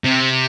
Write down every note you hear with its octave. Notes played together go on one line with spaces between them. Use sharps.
C3